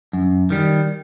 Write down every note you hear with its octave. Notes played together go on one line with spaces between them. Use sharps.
F#2
D#3 G3